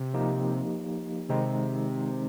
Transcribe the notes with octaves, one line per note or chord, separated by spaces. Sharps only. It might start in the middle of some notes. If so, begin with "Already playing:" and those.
Already playing: C3
F3 A#3 D#4 G4
C3 D#3 G#3 C4 D#4